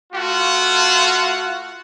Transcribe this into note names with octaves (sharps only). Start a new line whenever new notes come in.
A3 F4 F#4